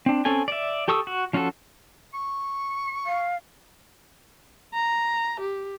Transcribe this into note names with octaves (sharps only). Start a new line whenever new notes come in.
C4 D4
C4 C#4 A4 G#5
D5 E5
G4 A4 C#6 D#6 E6
F#4
F3 C#4 F4 F#4 A4
C#6
F5
A#5
G4